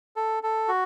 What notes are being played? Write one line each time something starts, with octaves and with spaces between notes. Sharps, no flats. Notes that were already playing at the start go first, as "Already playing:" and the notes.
A4
A4
F#4